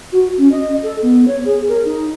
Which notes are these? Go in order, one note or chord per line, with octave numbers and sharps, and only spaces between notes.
F#4
C#4
D#5
A4
B3
C#5
G#4
A#4
D#4